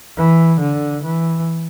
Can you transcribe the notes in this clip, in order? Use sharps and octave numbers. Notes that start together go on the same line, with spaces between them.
E3
D3
E3